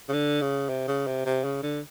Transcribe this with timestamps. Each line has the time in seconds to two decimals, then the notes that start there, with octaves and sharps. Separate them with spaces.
0.09 C#3
0.13 D3
0.41 C#3
0.69 C3
0.88 C#3
1.07 C3
1.26 C3
1.44 C#3
1.63 D3